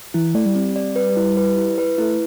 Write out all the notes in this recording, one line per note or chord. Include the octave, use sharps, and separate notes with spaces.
E3 E4
A3 D5
G3
C4
D5
B4
E4
B4
E4
B4
A3 E4